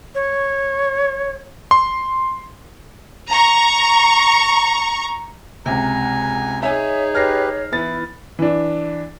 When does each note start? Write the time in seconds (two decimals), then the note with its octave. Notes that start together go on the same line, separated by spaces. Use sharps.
0.15 C#5
1.71 C6
3.31 A#5 C#6
5.66 C#2 C3 G#5 A#5
6.63 D#4 G#4 C#5 E5 G#5
7.15 G4 B4 F6 A#6 C7
7.72 E3 B3 E4 A6
8.39 E3 D4